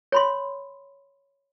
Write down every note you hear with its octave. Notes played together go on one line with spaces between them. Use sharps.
C#5 B5 C6